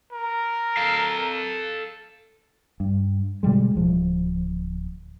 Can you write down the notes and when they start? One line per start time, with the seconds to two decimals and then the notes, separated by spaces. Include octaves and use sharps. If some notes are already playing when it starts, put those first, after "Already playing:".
0.13 A#4
0.77 A4 F5
2.80 G2
3.43 B2 D3 G3 G#3
3.75 D1 F3